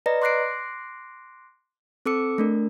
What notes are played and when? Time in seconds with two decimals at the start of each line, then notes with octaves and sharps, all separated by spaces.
0.06 B4 D5 D#5 A#5 A#6
0.22 C6 D6 F#6 A#6 C7 D7
2.06 C4 A4 D6 E6 C#7
2.38 A3 D4 A#4